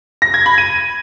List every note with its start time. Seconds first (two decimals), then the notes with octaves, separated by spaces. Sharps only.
0.22 A#6
0.34 G#6
0.46 B5
0.58 D#7